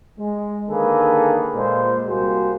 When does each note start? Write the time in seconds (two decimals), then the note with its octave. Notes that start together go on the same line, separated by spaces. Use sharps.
0.18 G#3
0.67 D3 D#3 A#3 G#4 A4 B4
1.53 A#2 G#3 C5
2.06 C2 G3 A#3 F#4 G#4 C5